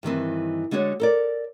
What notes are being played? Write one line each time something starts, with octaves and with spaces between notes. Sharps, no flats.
G2 D#3 E3 C4
D3 G#3 D4 F#4 C#5
A4 A#4 D5